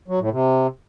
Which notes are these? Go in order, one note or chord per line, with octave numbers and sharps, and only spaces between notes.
F#3
A2
C3